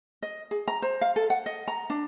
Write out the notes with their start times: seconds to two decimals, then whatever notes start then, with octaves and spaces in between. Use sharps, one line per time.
0.22 D#5
0.51 G#4
0.68 A#5
0.82 C5
1.01 F5
1.16 A4
1.30 F#5
1.46 D#5
1.68 A#5
1.90 D4